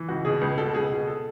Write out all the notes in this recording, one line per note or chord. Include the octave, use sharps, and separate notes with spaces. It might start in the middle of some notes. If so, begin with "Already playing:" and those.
Already playing: E3
C#2 F#4
B2 G#4
C#2 B4
B2 A4
C#2 G#4
B2
A4